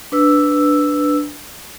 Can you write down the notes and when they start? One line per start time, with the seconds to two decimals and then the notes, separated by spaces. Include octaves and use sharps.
0.12 D4 B4 E6